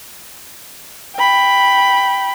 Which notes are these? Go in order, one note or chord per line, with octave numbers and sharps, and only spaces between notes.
G5 B5